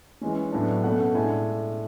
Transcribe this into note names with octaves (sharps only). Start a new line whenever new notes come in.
E3 G#3 C#4
A2 F#3 B3 D4
B2 A3 C#4 F#5
A2 G#3 D4 G#5